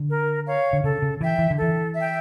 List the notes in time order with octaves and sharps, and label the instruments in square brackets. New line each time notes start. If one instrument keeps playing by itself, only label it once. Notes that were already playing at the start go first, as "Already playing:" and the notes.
Already playing: [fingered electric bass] D3
[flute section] A#4
C#5 F5
[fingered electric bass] D3
[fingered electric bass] C#3 [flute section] A4
[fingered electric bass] C#3
[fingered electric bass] E3 [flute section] E5 G5
[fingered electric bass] E3
D3
[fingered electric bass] E3 [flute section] A4
[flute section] E5 G5